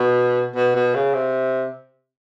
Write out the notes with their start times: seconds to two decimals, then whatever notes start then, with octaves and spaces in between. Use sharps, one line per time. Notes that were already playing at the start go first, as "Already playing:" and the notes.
Already playing: B2
0.56 B2
0.75 B2
0.95 C#3
1.14 C3